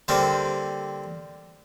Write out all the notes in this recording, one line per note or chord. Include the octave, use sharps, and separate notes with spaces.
D3 G3 A#3 C4